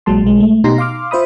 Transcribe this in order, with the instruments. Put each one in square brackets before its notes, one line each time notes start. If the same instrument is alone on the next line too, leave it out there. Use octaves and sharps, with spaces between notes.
[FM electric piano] A#1 A#2 F#3 G#3 A5 C6
B1 G#3
A3
B2 D#4 G4 A#5 C6 A#6
F5 C6 D6 F6
F4 C5 E5 B5 D#6